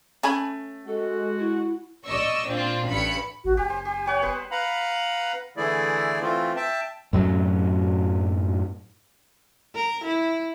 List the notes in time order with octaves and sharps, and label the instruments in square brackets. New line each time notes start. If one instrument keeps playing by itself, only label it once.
[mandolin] A3 [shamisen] C#4 G#5 B5
[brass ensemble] G#3 F#4 [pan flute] A4
[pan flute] E4
[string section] D5 D#5 C#6 E6
A#2 C4 D4 F4
A1 G2 B5 C#7
[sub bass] A1 [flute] F#4
[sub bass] F#1 [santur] G4 [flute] G#5
[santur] C5
[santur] G4 [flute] G#5
[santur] G3 C#5 F#5
B3 B4 C5
[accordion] B4 F5 F#5 A#5 B5
D3 E3 A3 E4 G#4 D5
E3 A3 C4 F4
E5 G5 A5
[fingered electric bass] F#2 A2 F#3
[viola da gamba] A#4
E4